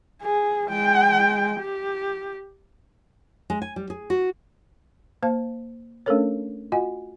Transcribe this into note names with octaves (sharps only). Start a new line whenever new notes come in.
G#4
G#3 G5
G4
G#3
G#5
G3
G#4
F#4
A#3 C5 F5 A5
A3 C#4 D4 A4 A#4 C#5
F4 F#4 D#5 F#5 G#5